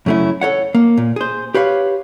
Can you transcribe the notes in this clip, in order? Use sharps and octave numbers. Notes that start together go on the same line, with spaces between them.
F#2 C#3 A3 C#4 E4
A4 A#4 C#5 F#5
A#3
A#2
G#4 C5
G4 B4 C#5 F5